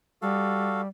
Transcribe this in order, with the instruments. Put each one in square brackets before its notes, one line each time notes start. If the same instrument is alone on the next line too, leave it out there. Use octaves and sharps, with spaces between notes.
[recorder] G3 [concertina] F#4 A4 F5